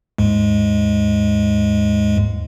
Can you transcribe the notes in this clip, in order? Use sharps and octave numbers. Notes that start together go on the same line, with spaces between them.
D#2 G#2 G#3